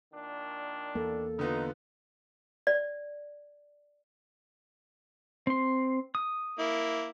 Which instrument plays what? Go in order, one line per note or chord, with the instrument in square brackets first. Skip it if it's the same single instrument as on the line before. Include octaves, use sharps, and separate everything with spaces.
[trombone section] A#2 D#3 D4
[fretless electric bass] E2 A#3 [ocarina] A4
[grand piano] D3 B3 F4 [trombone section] D#4
[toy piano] D5
[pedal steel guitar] C4 C6
D#6
[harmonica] A#3 E4